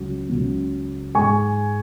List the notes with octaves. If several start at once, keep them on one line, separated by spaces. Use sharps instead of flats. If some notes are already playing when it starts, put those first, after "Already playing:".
Already playing: C#2 C#3 F#3
C#2 C#3 F#3
G#2 G#3 G#5 C#6